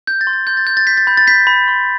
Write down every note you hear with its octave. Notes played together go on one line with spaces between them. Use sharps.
G6
A6
C6
A6
C6 G6
A6
G6
A6
G6 B6
A6
B5 G6
A6
G6 B6
B5
C6